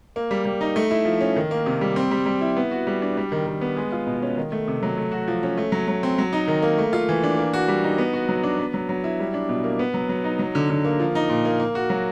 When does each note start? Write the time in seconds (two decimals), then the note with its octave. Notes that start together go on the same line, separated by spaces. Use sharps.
0.16 A#3
0.31 G3
0.45 G3
0.61 D#4
0.76 A3
0.91 E4
1.05 F3
1.21 C#4
1.36 D#3
1.51 A#3
1.66 C3
1.81 G3
1.96 C4
2.11 G3
2.26 G3
2.41 E4
2.57 B3
2.71 F#4
2.87 G3
3.02 D4
3.17 G3
3.32 D#3
3.47 D#3
3.61 B3
3.77 G#3
3.92 F4
4.07 B2
4.22 C#4
4.37 D#3
4.52 A3
4.68 C3
4.83 F#3
4.97 A3
5.12 F#4
5.28 F3
5.43 C#4
5.58 A3
5.72 F#3
5.88 F#3
6.03 C4
6.18 F#3
6.33 D#4
6.48 D#3
6.62 A#3
6.78 A3
6.93 F4
7.09 E3
7.23 D4
7.38 A#3
7.54 F#4
7.68 G3
7.84 D#4
7.98 B3
8.13 F#4
8.29 F#3
8.43 D4
8.59 B3
8.74 F#3
8.89 F#3
9.04 E4
9.20 G3
9.34 D4
9.49 B2
9.64 A#3
9.79 B3
9.94 F#3
10.09 F#3
10.24 D#4
10.39 F#3
10.55 D3
10.70 D3
10.85 A#3
11.00 F3
11.15 D#4
11.30 A#2
11.45 A#3
11.60 A#3
11.75 F#4
11.90 F#3